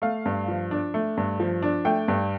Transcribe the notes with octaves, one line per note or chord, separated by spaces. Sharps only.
A3 F5
G2
F3
D4
A3
G2
F3
D4
A3 G5
G2